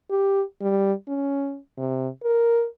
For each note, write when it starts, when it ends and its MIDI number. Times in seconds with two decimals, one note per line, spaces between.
0.10 0.43 67
0.61 0.93 55
1.08 1.58 61
1.78 2.08 48
2.24 2.66 70